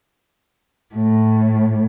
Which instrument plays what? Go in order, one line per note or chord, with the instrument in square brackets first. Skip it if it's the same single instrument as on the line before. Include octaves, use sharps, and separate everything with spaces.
[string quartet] A2